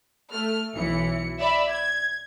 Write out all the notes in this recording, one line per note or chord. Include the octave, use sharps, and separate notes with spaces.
A3 F6
B1 E3 C#7
D5 E5 B5
G#6